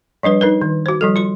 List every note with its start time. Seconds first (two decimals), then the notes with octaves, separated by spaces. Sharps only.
0.23 F3 G3 D4 B4
0.41 D#4 A#4 B4
0.61 D#3
0.86 F#4 C5
1.01 F3 G3 A4
1.16 F4 C6